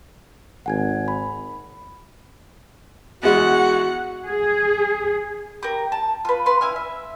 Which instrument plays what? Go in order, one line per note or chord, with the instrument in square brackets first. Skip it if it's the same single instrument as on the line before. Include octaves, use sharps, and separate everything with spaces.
[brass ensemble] G#1 [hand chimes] F#5 G#5 G#6
[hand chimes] B5
[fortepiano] E2 G#3 [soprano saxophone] F#4 [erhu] F#5
[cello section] G#4
[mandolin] G4 A#4
A5
F4 B4
B4 C6
E4 G#5 F6
E5